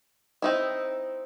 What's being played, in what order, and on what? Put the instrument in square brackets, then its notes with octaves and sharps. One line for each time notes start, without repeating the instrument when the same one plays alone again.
[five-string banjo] C4 D#4 E4